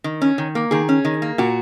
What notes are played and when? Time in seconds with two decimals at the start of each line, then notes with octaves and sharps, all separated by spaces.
0.04 D#3
0.21 C#4
0.38 D#3
0.55 A#3
0.71 D#3 G#4
0.89 C#4
1.05 D#3
1.22 A#3
1.38 A#2 F#4